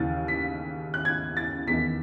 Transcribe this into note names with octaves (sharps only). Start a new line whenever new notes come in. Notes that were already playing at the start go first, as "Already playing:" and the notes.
Already playing: D#2 C#3 E3 A6
B6
F#6
G#6
A6
E2 D#3 B6